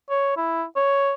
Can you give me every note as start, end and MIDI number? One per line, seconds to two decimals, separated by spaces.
0.10 0.34 73
0.37 0.64 64
0.76 1.14 73